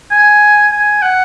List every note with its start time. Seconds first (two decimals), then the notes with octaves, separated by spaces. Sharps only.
0.11 G#5
0.72 G#5
1.02 F#5